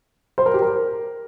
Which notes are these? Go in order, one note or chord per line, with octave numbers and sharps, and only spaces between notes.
C5
A#4
G4
A#4